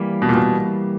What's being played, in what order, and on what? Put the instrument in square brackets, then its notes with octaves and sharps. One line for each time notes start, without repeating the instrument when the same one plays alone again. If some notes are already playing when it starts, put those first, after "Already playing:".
Already playing: [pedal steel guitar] E3 G3 A#3
[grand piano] B2
A#2
B2